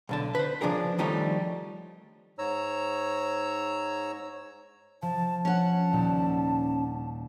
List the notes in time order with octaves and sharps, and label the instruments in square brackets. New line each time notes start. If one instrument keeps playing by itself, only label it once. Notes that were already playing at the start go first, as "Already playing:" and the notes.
[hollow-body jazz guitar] B1 D3 A5
B4 C5
C#3 F3 D4 G#4 A#4
D#3 F3 G3 A3 D#4 C#5
[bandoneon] G#2 C#5 A#5 E6
[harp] F3 [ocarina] A5
[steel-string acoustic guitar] C#4 F#5 [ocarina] A5
[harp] D#2 A#2 G3